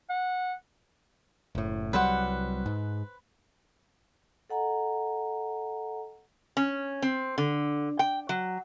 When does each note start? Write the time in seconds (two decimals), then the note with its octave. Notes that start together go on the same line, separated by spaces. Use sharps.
0.10 F#5
1.55 F#1 A2
1.93 C2 F#3 G3 B4 C5 F#5
2.66 G#2
4.50 A4 D#5 F#5 G#5 A#5
6.57 C#4
7.02 C4
7.38 D3
7.99 G5
8.29 F#3